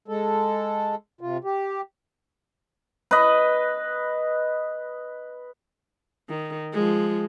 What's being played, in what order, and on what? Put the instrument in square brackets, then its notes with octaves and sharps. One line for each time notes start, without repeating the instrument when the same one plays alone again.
[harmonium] G#3 A4
C3 F4
G4
[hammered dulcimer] B4 D#5
[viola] D#3
F3 G#3